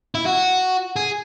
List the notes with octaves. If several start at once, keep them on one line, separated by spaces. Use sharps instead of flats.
E4
F#4
G#4